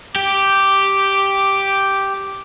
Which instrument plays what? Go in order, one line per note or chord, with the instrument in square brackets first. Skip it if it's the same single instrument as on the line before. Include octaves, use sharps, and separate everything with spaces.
[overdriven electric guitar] G4 [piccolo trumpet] D6